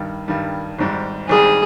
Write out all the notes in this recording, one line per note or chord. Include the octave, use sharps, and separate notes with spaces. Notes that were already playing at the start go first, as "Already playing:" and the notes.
Already playing: G2 D#3 G3
G2 D#3 G3
G#1 G#2 G3
G#1 G#2 G3 G#4